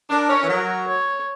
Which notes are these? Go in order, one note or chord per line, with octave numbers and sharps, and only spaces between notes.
D4 A#4
C#4
E3
F#3 A#4
C#5